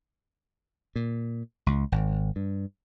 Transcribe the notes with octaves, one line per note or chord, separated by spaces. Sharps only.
A#2
C#2
G#1
G2